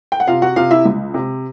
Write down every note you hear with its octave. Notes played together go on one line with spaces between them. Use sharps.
G5
F#5
C3 F4 F5
F#4 F#5
C3 F4 F5
E4 E5
C#2
C3